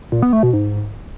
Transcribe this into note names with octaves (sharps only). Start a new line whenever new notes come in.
A#2
B3
A3
B2
G#2